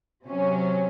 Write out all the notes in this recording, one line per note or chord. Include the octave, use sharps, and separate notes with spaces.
C3 F#3 C#4